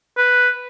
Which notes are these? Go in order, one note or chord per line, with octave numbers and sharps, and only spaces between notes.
B4